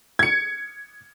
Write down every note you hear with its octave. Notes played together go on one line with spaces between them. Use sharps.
G#6 C#7